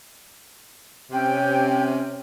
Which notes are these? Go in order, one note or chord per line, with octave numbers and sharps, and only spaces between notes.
C3 C#4 G5